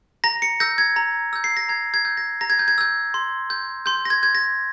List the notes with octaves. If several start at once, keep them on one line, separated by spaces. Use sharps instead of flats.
A#5 A#6
C#7
E6 G6 A#6
G#6
A#5
E6 G6
C7
A#6
A#5 G#6
G#6
E6 G6
A#6
A#5 A#6
G#6
G6
G#6
E6 G6
C6
G6
C6 G6
A#6
G#6
G6 G#6
A#6